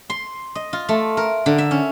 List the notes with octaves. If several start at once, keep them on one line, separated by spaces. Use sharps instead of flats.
C6
D#5
F4
A3
A#4
D3
E5
C#4